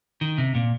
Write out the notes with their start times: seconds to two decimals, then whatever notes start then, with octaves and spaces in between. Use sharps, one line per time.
0.21 D#3
0.38 C3
0.55 A#2